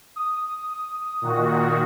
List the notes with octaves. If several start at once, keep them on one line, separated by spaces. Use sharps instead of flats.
D#6
A#2 D#3 F#4